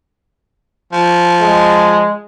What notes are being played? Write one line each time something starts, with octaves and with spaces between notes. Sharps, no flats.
F3
G#3